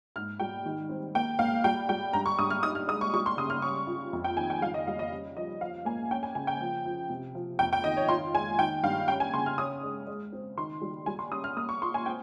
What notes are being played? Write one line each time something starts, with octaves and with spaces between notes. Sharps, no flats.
G#2 F6
G3 G5
D#3
C4
A#3 G5
A#3 F5
G3 G5
G3 G5
G2 A#5
C#6
G2 D#6
F6
D#4 D#6
F6
G#3 D#6
C#6
G3 C#6
C6
C#3 D#6
F6
C#4 C#6
F4
F2
G5
D#3 G#5
G5
G3 F5
D#5
G3 F5
D#5
C#4
F3 D#5
F3 F5
A#3 G#5
C#4 G5
G#5
C#3 G#5
G5
F3
F3
C3
F3
F2 G5
G5
D#3 D#5
C#5
F4 C6
G#3 G#5
D#3 G5
G2 F5
C#4 G5
G#5
C#3 C6
F6
C#4 D#6
G#3
G#3
C4
D#3 C6
G3
G3 G#5
C6
C#4 D#6
F6
A#3 D#6
C#6
F4 C6
G#5
C4 G5